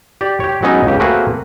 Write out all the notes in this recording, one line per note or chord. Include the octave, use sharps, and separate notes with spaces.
G4 D5
G4 C#5
F#3 G#3 B3 C#4 D#4
C#2 C#3 G4
A3 A#3 C4 F#4 G#4 B4